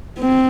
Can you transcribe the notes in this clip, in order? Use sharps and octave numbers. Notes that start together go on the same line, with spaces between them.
C4